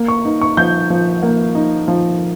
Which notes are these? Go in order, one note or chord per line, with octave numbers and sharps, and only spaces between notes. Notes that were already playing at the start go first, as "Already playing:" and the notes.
Already playing: A#3
C#6
D#4
C#6
F3 G6
F3
A#3
D#4
F3